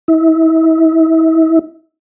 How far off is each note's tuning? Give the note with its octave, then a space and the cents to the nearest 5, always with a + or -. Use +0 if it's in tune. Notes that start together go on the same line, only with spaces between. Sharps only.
E4 -35